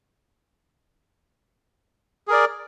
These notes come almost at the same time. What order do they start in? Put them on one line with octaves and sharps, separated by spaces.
G#4 A#4 D5